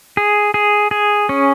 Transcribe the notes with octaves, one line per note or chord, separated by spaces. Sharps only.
G#4
G#4
G#4
C#4